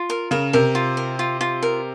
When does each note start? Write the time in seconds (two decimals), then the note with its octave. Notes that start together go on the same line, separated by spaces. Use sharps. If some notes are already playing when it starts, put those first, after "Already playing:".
Already playing: F4
0.10 A#4
0.31 C#3 A#4
0.53 C3 A#4
0.75 F4
0.97 A#4
1.19 F4
1.41 F4
1.63 A#4